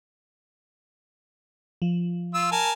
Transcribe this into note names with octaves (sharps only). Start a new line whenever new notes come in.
F3
F4 E6
A#4 G#5 A5